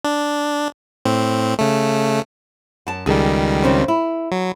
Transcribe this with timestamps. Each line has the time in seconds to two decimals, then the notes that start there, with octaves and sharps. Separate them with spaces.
0.05 D4
1.05 A2 C4
1.59 C#3 A3
2.87 F#2 A5
3.06 C#2 D#3 G3 G#4 A4
3.64 C#3 C4 C#4
3.88 E4
4.32 F#3